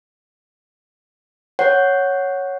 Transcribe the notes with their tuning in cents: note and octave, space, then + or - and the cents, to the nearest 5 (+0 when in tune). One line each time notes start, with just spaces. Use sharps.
C#5 +0 F#5 +0